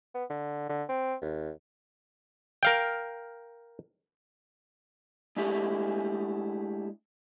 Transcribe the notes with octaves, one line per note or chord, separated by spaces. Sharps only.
B3
D3
D3
C4
D#2
A#4 F5 G5
G#3 A3 D4 E4 G4 G#4